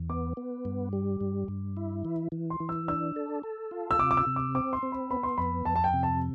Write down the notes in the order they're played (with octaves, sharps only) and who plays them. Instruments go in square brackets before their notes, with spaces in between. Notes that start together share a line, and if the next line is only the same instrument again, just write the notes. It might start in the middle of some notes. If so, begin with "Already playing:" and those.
Already playing: [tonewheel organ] E2
[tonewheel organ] B3 [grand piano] D6
[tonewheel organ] B3
G2
G3
G2
G2
E4
E3
E3
[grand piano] C6
[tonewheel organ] E3
[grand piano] E6
[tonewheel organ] D4 [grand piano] E6
[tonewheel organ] A4
A4
F4
[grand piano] E6
[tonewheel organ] C3 [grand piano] D6
[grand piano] D6
E6
[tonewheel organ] C3
[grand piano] D6
[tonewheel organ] C4 [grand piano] D6
[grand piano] C6
[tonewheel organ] C4
[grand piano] B5
[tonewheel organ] B3 [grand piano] B5
[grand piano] C6
[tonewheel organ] F2 [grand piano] B5
[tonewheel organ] F2 [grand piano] A5
[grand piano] A5
G5
[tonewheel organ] C3
[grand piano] A5